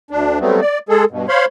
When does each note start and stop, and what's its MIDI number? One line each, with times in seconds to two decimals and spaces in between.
0.11 0.39 38
0.11 0.39 62
0.40 0.61 54
0.40 0.61 55
0.40 0.61 57
0.40 0.61 59
0.40 0.61 60
0.61 0.79 74
0.89 1.05 56
0.89 1.05 68
0.89 1.05 69
1.11 1.26 43
1.11 1.26 47
1.29 1.45 72
1.29 1.45 73
1.29 1.45 77
1.29 1.45 83
1.29 1.45 84